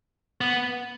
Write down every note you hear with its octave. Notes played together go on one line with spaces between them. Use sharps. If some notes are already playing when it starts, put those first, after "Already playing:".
B3